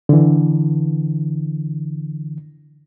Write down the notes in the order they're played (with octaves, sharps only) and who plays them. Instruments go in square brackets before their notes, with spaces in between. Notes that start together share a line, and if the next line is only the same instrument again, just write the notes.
[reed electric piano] D3 E3